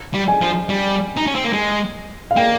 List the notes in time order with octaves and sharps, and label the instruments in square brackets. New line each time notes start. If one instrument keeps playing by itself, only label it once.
[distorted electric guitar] G3
[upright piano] G#5
[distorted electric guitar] F3
G3
D#4
C#4
C4
A#3
G#3
[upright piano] F5
[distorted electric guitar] A#3 [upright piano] G5